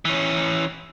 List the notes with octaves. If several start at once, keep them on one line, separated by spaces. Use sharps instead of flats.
E3 C#4